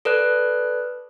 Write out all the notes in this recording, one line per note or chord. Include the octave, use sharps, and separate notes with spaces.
A4 B4 D5 F#6